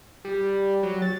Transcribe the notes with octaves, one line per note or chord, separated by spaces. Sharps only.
G3
F#3
A6